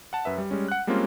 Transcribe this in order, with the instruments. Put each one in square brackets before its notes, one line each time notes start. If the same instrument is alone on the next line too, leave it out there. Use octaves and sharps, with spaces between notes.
[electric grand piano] F#5 A5
F#2 B4 E5
G3
G3 G#3 C#4
F#5 F#6
G3 G#3 A#3 C4 C#4 F4